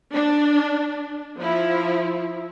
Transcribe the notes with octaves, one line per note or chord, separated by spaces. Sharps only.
D4
F3 E4